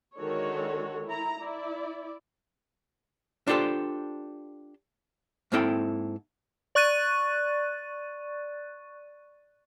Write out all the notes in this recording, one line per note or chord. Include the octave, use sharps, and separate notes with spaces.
D3 D#3 G#3 F#4 A4 C#5
E4 A#5
E4 D5
D4 F4 G4 A4 C5
G#2 A#3 C4 E4 A4 G5
D5 C#6 F#6 A6 D#7